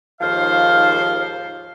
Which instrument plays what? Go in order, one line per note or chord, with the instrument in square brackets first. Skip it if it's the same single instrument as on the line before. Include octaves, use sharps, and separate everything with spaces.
[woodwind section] D#2 G#2 F3 C5 F5